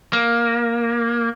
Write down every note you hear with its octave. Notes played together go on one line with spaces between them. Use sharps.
A#3